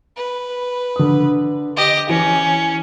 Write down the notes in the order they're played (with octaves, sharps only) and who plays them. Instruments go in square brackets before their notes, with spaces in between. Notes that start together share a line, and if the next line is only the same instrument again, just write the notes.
[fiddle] B4
[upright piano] D3 D#6
[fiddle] G4 D#5
[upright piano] E3 [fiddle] C#4